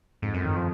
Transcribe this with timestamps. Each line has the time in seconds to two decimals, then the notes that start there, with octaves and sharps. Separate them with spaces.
0.22 F2 G#2
0.34 F#2
0.45 D#3
0.56 F3